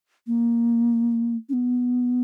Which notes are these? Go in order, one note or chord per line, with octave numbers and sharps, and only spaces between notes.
A#3
C#4
B3